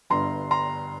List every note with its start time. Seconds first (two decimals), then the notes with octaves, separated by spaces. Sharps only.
0.10 G1 G2 D3 A#5 C6
0.51 A#5 C6